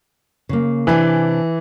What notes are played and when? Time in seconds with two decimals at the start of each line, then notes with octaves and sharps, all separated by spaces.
0.49 C#3 A#3
0.87 C3 E3 D4 G#5